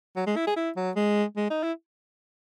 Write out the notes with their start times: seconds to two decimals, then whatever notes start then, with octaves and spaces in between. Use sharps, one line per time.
0.16 F#3
0.27 G#3
0.36 E4
0.47 G#4
0.56 E4
0.77 F#3
0.96 G#3
1.37 G#3
1.51 D#4
1.63 E4